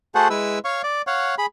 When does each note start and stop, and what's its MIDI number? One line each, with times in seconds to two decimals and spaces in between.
0.15 0.28 57
0.15 0.28 66
0.15 0.28 68
0.15 0.28 69
0.15 0.28 72
0.15 0.28 78
0.30 0.59 56
0.30 0.59 64
0.30 0.59 71
0.30 0.59 88
0.65 0.82 73
0.65 0.82 77
0.65 0.82 85
0.83 1.02 74
1.07 1.35 73
1.07 1.35 77
1.07 1.35 78
1.38 1.46 68
1.38 1.46 83